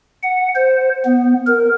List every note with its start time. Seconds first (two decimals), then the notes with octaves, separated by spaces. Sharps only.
0.23 F#5
0.56 C5
1.05 B3
1.46 A#4